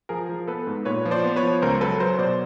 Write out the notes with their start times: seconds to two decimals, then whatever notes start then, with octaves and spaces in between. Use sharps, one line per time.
0.09 F3 G#4 A#4
0.29 F3
0.47 B3 A4 B4
0.67 G#2
0.85 A#2 B4 C#5
1.05 F3
1.11 C5 D5
1.24 B3
1.36 B4 C#5
1.43 F3
1.62 C#2 A#4 C5
1.81 F#3 A4 B4
2.00 F#3 A#4 C5
2.19 B2 C5 D5